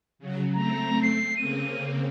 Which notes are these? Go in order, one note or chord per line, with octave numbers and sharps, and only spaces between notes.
C#3 F#3
A3 C4 A#5
C7
C#3 A#3 C4 D#7